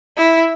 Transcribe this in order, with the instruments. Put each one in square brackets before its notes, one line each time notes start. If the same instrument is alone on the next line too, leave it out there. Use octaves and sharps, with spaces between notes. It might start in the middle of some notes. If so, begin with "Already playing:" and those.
[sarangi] E4